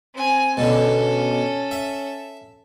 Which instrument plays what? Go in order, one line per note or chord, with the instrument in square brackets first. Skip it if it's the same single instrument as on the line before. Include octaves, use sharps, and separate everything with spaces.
[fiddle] C4 G#5
[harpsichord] B2 D3 [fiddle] C#4 A4
[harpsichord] E5